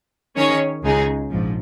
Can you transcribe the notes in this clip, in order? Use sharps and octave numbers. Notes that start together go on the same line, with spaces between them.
D#3 C#4 G#4 C#5
C#2 C#3 G#3 D#4 G#4
A#1 G#2 F3